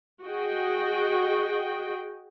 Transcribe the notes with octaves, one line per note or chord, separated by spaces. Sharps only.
F#4 G#4 D#5 G5